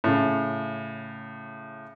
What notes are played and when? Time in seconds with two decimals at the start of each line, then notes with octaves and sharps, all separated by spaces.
0.04 A2 C#3